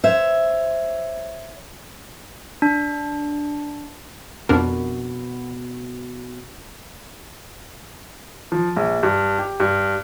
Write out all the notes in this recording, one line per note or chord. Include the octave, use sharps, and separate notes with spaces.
C5 C#5 E5
D4
F2 B2 D4 A#4
F3
A#1
G2
G4
G2